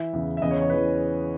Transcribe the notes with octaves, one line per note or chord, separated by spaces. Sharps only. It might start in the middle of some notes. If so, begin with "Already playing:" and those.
Already playing: E3 E5
E2 C#3 E3
E5
E2 C#3 E3 D#5
C#5
C#5
C#3 E3 B4